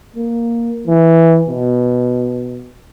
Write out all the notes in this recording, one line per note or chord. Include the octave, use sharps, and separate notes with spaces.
A#3
E3
B2